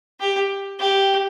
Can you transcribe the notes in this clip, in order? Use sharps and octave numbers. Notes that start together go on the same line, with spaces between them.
G4
G4